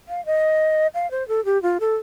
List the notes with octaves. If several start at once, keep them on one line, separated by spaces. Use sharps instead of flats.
F5
D#5
F5
C5
A4
G4
F4
A4